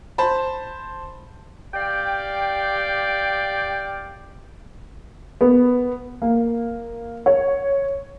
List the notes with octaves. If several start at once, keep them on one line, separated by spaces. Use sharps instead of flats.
C5 A5 B5
G4 D5 F5 G5
B3
A#3
C#5